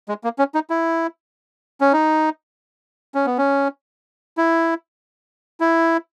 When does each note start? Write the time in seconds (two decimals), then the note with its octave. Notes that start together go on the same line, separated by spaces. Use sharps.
0.09 G#3
0.24 A#3
0.39 C#4
0.54 D#4
0.70 E4
1.81 C#4
1.93 D#4
3.15 C#4
3.26 B3
3.38 C#4
4.37 E4
5.60 E4